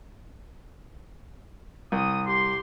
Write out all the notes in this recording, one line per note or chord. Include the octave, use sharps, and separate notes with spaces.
C2 D#6
G4 C6